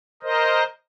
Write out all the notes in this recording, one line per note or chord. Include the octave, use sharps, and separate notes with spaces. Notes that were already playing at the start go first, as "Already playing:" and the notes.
A#4 C5 D#5